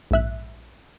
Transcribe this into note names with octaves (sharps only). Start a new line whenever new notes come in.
A#1 G#2 E5 F#6